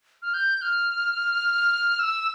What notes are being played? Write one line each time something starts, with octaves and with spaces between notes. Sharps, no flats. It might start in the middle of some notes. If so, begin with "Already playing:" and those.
F6
G6
F6
E6